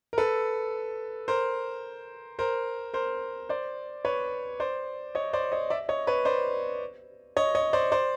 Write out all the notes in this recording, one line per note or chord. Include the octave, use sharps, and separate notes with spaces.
A#4
A4 B4
A#4 C5
A#4 C5
A#4 C5
C5 D5
B4 C#5
C5 D5
C#5 D#5
C5 D5
C#5 D#5
D5 E5
C#5 D#5
B4 C#5
C5 D5
C#5 D#5
C#5 D#5
C5 D5
C5 D5